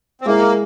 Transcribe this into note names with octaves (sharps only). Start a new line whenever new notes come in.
C4
G#3 A#3 E4 A#4